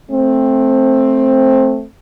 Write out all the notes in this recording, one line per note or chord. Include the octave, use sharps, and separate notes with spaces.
A3 C4